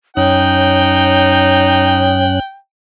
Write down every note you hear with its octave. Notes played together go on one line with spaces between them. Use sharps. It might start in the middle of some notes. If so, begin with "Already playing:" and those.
F#2 C#4 D#4 C#5 G5 F#6